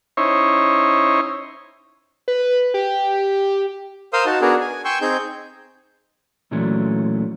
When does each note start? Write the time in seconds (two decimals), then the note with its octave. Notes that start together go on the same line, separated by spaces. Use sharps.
0.17 C#4 D#4 E4 C5 C#5
2.28 B4
2.74 G4
4.13 A#4 C5 F5 C6 D#6 E6
4.26 D#4 F#4 A5
4.41 B3 D4 F#4 G#4 A#4
4.60 G#5
4.85 G5 G#5 C6 C#6 E6
5.01 C4 D#4 G#4 G6
6.51 A#2 E3 F#3 A3 C#4 D4